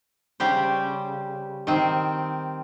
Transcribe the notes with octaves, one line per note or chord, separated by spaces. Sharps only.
C#3 G3 G4 C5
D#3 C4